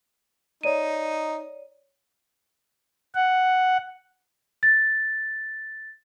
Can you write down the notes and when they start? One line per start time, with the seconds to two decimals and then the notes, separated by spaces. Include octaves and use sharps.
0.63 D#4 C#5 D5 D#7
3.15 F#5
4.63 A6